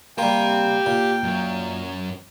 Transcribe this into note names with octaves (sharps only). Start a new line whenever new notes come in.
G3 A#3 G4 G5 C6
A#2
F#2 F#3